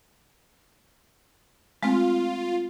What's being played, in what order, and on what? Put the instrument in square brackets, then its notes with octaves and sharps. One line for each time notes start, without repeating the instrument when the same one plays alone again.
[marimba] G#3 A3 C4 [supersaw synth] F4